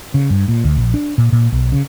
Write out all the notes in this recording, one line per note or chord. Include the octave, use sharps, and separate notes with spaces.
C#3
G2
A#2
D2
A#1
D4
A#2
A#2
B1
C#3